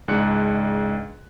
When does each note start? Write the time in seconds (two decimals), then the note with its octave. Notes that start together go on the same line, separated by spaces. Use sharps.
0.08 C#2 G#2 D4 D5 F#6 C#7